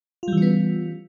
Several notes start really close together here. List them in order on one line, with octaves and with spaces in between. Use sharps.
F4 G3 E3 C#4 B3